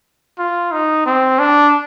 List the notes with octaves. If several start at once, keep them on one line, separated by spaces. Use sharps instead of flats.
F4
D#4
C4
D4